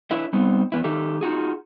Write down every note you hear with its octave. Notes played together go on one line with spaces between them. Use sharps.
D4 E4 B4 C#5 E5
G3 B3 C4 D#4
E2 B3 E4
D#3 D#4 G4 A4 E5
D#4 F4 F#4 G#4